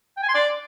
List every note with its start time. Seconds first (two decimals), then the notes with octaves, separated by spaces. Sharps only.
0.17 G5
0.23 G#5
0.29 C6
0.34 D5